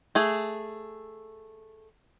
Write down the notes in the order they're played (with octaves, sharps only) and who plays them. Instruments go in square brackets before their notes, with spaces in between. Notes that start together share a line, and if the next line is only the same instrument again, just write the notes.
[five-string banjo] A3 G#4